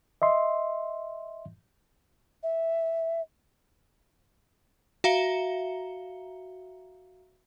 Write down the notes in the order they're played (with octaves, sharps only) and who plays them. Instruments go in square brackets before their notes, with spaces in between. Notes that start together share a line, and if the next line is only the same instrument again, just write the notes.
[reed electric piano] D#5 E5 C6
[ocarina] E5
[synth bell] F#4 E5 F5 A#5 C#7 G7